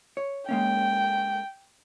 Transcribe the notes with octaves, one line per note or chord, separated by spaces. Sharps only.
C#5
G#3 A#3 C#4 G5